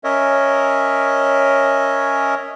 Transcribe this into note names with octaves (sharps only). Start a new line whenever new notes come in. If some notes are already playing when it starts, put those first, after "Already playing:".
C#4 A#4 C#5 D#5 E5